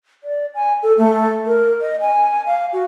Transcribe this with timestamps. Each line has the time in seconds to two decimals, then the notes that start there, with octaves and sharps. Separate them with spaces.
0.24 D5
0.55 G#5
0.83 A4
0.98 A3
1.46 A#4
1.81 D#5
2.01 G#5
2.46 F5
2.73 F#4